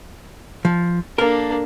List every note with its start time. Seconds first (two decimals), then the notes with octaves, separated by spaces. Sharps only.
0.65 F3
1.18 A#3 D4 A4 A#4